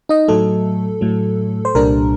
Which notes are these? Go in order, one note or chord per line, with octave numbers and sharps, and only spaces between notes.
D#4 D#5
A2 F#3 A3 A4
A2 F#3 A3
C5
C2 A#2 G3 D4 A#4